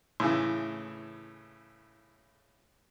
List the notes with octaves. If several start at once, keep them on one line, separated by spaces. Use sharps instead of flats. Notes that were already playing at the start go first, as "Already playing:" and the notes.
A2 C#3 E3